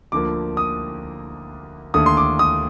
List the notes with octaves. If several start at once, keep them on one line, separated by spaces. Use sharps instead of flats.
D2 D3 F3 A#3 D6
D#6
D#2 D3 A3 D#6
C6
D6
D#6